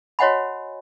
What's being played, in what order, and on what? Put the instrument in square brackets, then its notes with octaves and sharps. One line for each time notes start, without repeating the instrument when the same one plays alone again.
[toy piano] F#4 C#5 D#5 F#5 G#5 B5